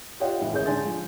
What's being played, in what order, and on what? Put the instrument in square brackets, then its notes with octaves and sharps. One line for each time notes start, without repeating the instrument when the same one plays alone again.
[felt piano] F4 G4 C#5 D#5 F#5 G5
A2 E3
G#1 C#3 C#4 G#4 C#5 G6
G#2 D3 D4 G#5 C6 A6
F3